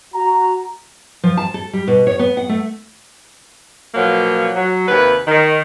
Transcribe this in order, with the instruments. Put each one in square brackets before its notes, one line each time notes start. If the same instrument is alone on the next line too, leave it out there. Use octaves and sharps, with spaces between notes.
[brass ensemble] F#4 A#5
[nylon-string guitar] F3
A5
A4
G3
B2
C#5
B3
F#5
A3
[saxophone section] B2 F3 F#3 A#3
F#3
D#2 C3 B4
D#3